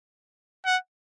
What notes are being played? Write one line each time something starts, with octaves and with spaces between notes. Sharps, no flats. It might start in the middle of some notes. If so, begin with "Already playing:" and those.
F#5